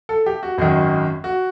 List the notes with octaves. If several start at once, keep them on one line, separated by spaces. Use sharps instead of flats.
A4
G4
F#4
G#1 F#2 D#3 F#4
F#4